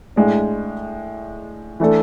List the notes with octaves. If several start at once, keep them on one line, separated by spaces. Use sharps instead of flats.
A2 G#3 D4
E3 A3 D4 A4